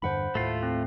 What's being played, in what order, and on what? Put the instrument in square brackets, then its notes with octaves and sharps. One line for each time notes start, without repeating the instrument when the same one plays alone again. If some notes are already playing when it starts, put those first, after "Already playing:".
[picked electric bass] E2 G2 D3 [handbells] C5 F#5 B5
[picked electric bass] D#2 A2 [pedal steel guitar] A3 F4
[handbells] C4